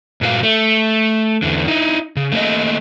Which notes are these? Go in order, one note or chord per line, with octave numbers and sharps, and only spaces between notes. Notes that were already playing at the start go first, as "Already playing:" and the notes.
G2 A#2 F#4 G4 F5
A3
E2 D3
D#4 E4
C#3
A3 A#3 C#5 D#5